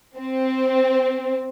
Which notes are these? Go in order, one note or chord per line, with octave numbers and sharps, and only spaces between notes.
C4